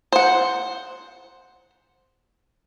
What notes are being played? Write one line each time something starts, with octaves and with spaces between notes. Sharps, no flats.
C5 F#5